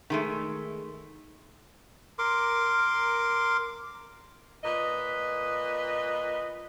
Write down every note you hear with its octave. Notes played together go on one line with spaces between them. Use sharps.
D#3 G#3 A3
A#4 C6 D6
A#2 B4 D#5